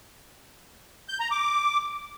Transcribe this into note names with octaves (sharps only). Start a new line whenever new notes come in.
G6
A#5
D6